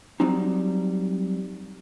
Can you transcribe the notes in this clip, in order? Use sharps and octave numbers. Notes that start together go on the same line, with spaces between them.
F#3 G3 C4 D#4